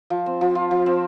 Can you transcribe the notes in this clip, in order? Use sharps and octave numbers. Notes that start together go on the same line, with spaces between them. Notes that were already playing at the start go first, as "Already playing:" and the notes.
F3
C4
F3
F4
F3
C4